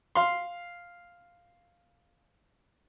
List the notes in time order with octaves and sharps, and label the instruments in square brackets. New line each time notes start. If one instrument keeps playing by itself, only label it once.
[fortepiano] F5 C6